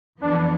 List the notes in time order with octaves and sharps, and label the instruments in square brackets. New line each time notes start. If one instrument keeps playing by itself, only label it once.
[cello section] F2 E3 B3 [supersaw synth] D4